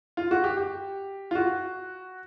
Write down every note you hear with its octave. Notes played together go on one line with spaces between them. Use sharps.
F4
F#4
G4
G4
F4
F#4